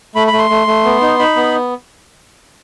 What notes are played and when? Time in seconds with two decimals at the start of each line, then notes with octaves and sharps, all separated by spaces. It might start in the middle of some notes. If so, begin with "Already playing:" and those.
0.15 A3 B5
0.27 B5
0.33 A3
0.39 C6
0.50 A3
0.67 A3
0.85 B3
1.01 D#4
1.19 D#4 B5
1.36 B3